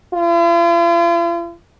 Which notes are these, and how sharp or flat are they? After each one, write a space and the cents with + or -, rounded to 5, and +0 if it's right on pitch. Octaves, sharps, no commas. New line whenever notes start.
F4 -45